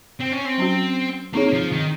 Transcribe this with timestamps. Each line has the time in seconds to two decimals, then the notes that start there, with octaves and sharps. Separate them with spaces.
0.21 C4
0.33 C#4
0.46 C4
0.58 F#3 C#4 F#4
1.33 A#3 C4 D#4 G#4 C#5
1.53 F3
1.72 D#3